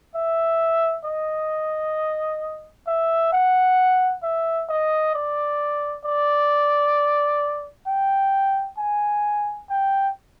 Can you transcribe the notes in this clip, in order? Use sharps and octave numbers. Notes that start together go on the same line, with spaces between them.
E5
D#5
E5
F#5
E5
D#5
D5
D5
G5
G#5
G5